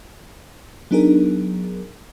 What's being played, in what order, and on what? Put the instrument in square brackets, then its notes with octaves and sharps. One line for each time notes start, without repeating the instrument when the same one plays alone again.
[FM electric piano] F#3 B3 D4 D#4 G#4 A#4